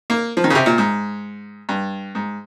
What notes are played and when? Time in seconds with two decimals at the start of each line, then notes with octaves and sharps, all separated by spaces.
0.10 A#3
0.37 F3
0.44 D#3
0.50 C#3
0.55 C3
0.66 A#2
0.78 G#2
1.69 G2
2.15 G#2